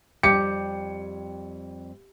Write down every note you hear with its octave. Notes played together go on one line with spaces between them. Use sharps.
F2 G3 G4 C#7